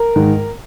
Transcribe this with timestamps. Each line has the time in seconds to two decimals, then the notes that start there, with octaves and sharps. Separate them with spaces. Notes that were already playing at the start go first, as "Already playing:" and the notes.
Already playing: A#4
0.16 G#2 D#3